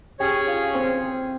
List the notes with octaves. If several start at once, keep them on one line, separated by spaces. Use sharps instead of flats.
C#4 G4 G#4 C#5 G5
F4 F5
C4 C5